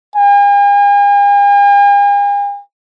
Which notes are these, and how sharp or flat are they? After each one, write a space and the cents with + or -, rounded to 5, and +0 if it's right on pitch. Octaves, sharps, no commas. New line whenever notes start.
G#5 -45